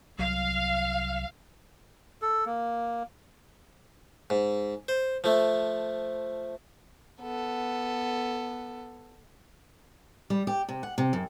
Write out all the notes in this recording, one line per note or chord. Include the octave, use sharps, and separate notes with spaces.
C2 F#3 F5
A4
A#3
G#2
C5
F3 A3
B3 A4
G3
G4
C3
F#5
C3
F#2